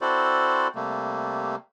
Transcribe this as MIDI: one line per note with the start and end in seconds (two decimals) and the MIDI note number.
0.01 0.67 60
0.01 0.67 64
0.01 0.67 66
0.01 0.67 69
0.01 0.67 72
0.01 0.67 74
0.75 1.56 48
0.75 1.56 55
0.75 1.56 57
0.75 1.56 58